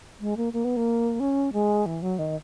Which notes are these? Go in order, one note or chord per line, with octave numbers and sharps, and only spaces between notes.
G#3
A#3
A#3
B3
A#3
C#4
G#3
E3
F#3
D#3